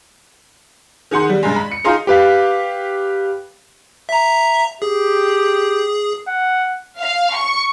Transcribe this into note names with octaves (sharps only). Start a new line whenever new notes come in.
D#3 G#4 F#5 C6
G3
G2 G#3
B5
C#7
D#4 F4 G#4 F5 C6
G4 B4 F5
E5 A#5
G4 G#4
F#5
F5
C#6